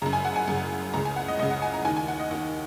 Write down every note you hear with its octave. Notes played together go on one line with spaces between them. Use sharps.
F#2 C#3 A#5
G#5
F#5
G#5
F#2 C#3
C#2 C#3 A#5
G#5
F#5
D#5
C#2 C#3 D#5
F#5
G#5
A#5
D#2 D#3 G#5
G#5
F#5
D#5
D#2 D#3